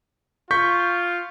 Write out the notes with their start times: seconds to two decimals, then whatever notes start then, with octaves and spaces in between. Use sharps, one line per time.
0.51 F4 C#6 G6 B6